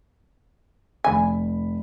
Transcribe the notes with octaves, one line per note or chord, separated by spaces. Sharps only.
F1 G#5 B5